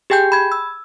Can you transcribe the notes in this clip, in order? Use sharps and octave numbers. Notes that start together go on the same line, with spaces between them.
G4 G#4 G5 G#5 G6
B5 G#6
E6